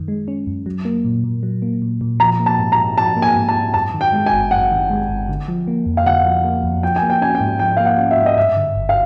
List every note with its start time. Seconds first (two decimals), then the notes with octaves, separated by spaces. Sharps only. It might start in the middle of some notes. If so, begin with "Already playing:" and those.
Already playing: F#2 D#3
0.08 G#3
0.28 C#4
0.47 F#2
0.66 F#3
0.85 A#3
1.05 A#2
1.24 A#2
1.43 F#3
1.62 A#3
1.82 A#2
2.01 A#2
2.20 F3 A#5
2.39 A#3
2.46 A5
2.58 G#2
2.72 A#5
2.78 G#2
2.98 F3 A5
3.16 A#3
3.22 G#5
3.36 G#2
3.49 A5
3.56 G#2
3.74 F#2 A5
3.94 D#3
4.01 G5
4.13 G#3
4.26 G#5
4.32 G1
4.51 F#2 F#5
4.71 D#3
4.90 G#3
5.09 G1
5.29 D3
5.48 F3
5.67 A#3
5.86 F2
5.97 F5
6.06 D3 F#5
6.25 F3
6.44 A#3
6.64 F2
6.83 F3 G5
6.96 G#5
7.02 A#3
7.10 G5
7.22 C#4 G#5
7.35 G5
7.41 G#2
7.59 F3 G5
7.77 A#3 F5
7.86 F#5
7.98 C#4
8.11 E5
8.17 G#2
8.26 D#5
8.37 G2 E5
8.57 D3
8.76 G1
8.89 F5